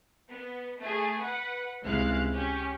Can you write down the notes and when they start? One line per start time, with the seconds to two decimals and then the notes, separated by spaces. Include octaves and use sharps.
0.29 B3
0.79 A3 G#4
1.20 B4 F#5
1.83 C#2 C3 G#3 E4 F5 F#6
2.34 C#4 G4